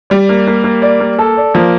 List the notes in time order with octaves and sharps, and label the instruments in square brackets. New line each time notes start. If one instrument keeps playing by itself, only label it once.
[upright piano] G3 [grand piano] D5
[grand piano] A#3
A#3
A#3
D5
A#3
A4
D5
[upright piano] F3 [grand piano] A#3